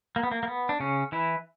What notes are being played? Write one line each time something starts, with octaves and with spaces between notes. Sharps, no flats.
A#3
B3
A#3
A#3
B3
D4
C#3 C#4
E3 E4